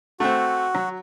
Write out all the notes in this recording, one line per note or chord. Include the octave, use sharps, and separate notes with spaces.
A3 C4 F#4
F#3